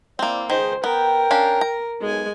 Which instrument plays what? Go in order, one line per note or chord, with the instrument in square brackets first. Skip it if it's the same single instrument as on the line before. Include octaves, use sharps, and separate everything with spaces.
[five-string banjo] A#3 C4 [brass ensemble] E4 D5
[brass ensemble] C#2 G#4 [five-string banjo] D#3 [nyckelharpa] C5
[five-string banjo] B3 [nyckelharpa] A#4 [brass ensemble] G5
[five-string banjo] C#4 D4 F5
A#5
[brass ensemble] B1 [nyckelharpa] G#3 G#5